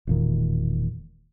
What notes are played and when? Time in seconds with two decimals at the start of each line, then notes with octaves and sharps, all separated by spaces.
0.07 E1 A#2 D#3